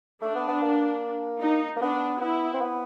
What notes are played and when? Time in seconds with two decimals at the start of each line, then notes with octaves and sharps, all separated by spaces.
0.22 A3 D4
0.35 B3
0.48 B3
0.62 A#3
1.41 D#4
1.76 A#3
1.81 B3 D4
2.21 B3 E4
2.54 C4
2.61 B3